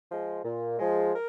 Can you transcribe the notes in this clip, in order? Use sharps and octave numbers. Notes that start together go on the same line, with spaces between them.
F3 G#3
A#2
F3 G#3
A#4